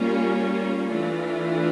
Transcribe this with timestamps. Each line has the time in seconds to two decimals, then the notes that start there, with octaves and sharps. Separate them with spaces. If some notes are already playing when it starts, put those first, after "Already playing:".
Already playing: G3 A#3 C#4 F4
0.89 E3 A3 D4 F4